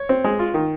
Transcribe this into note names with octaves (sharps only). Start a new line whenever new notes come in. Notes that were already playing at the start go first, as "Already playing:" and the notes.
Already playing: C#5
C4
G#3
F4
D#3